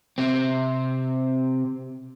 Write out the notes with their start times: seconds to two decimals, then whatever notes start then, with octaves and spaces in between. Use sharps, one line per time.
0.18 C3 C4